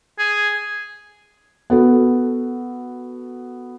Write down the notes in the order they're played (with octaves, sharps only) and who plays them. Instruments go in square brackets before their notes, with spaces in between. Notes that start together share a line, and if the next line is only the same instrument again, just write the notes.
[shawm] G#4
[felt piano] B3 F#4 A4